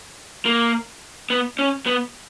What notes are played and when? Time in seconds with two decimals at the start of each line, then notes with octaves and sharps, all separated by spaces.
0.46 A#3
1.30 B3
1.59 C#4
1.86 B3